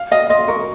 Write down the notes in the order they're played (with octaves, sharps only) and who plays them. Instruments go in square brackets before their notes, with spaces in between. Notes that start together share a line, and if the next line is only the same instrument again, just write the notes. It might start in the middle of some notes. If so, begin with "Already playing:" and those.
Already playing: [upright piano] F5
[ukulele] D#5 [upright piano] F5
[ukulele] D#5 [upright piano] C6
[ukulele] A#4 [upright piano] C#6